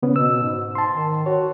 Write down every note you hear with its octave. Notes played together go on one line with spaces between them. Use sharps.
C#3 B3 C#4
B2 E6
G#2
A5 C6
D#3
F#4 C#5